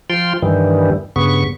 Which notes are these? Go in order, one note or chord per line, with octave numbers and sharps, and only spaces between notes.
F3 F4 G5 C6
G2 D#3 E3 G3
G2 C#3 B3 C#6